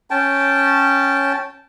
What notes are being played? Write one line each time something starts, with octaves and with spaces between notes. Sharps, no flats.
C#4 G5 A5